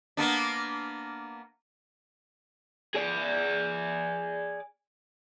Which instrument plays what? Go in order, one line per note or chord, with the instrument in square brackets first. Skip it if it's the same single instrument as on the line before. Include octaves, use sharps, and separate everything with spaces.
[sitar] A#3 B3 D4
[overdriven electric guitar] G#4 D5